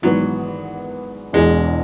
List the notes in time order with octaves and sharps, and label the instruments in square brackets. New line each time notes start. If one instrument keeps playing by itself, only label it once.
[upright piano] G#1 G#2 E3 B3 [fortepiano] F#3
[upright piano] E1 E2 B2 [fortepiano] G#3